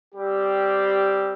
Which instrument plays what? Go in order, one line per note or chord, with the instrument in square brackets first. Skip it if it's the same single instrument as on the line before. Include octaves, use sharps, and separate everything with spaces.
[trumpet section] G3 C4 G4